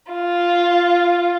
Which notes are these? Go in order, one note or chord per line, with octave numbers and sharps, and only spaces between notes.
F4